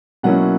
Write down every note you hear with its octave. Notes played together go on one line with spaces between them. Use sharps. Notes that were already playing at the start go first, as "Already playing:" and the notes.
B2 F#3 A#3 C#4 E4 F#5